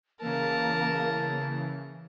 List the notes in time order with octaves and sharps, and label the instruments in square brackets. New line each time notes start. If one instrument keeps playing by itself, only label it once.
[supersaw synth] C#3 E3 [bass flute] A#3 [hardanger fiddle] A#4 A5